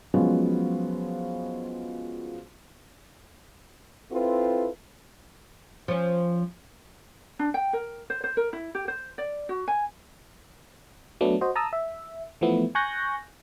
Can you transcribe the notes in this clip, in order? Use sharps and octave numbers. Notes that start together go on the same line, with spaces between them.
F3 F#3 G#3 B3 C#4
C4 E4 F4 A4 B4
F3 C#4
D4
G5
A#4
C5
C5
A#4
E4
G4
C5
D5
F#4
G#5
F#3 A3 B3 D4
F#4 C5 D#5
A5 A#5 D#6 E6
E5
E3 F3 A3 B3 E4
G#5 C#6 F#6 G6 A#6